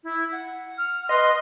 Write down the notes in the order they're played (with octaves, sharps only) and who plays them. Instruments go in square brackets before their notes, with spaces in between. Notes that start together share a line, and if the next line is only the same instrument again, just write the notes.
[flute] E4
F#5
[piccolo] F6
[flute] B4 [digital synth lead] D#5 [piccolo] C6